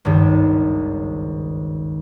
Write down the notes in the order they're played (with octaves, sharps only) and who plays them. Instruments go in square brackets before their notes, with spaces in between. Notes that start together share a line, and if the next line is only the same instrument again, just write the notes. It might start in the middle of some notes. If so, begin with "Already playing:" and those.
[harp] G#1 C#2 G2 D#3